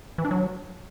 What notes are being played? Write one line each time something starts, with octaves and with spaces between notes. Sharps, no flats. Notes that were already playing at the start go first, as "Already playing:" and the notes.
E3
D4
F#3